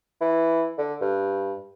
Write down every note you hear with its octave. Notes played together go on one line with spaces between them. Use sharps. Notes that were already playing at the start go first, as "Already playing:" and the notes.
E3
D3
G2